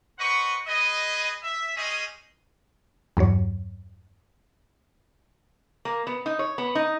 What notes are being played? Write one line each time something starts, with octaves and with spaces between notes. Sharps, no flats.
B4 C5 D#5 F#5 C#6
G#4 B4 D#5
E5
G3 G#3 C#4 G#4 D#5
E2 G2 F#3 C#5
A#3
B3
D#4
C#5
B3
D#4